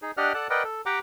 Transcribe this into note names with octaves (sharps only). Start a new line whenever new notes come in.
D#4 G#4
D4 G4 D5 D#5 F#5 F6
A4 D5 F#5 A5 F#6
A#4 B4 D5 D#5 F#5 G5
A4
G4 F#5 G5 A#5 D6